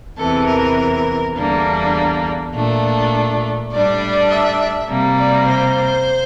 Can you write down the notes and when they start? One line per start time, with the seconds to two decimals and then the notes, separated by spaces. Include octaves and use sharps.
0.18 E2 C3 E3 A4
0.48 A#4
1.35 E2 D3 G3 A#3 D4
2.53 A#2 A3 D4
3.71 A2 G3 D4 D5
4.31 E5
4.89 C3 G3 A#3
5.19 D5
5.48 C5